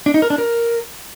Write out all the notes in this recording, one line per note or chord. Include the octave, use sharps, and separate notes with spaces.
D4
D#4
A#4
D4
A#4